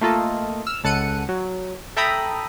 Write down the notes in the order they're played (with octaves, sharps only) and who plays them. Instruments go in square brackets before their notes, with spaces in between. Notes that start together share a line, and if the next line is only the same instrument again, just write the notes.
[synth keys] A3 A#3 F4 A4 D#5
E6 F6
C#2 A4 F#5 C#7 D#7
F#3
A4 E5 G5 A#5 B5 D#6